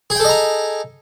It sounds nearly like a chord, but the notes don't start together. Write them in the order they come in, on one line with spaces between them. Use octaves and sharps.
G#4 G5 A4 D#5 A#5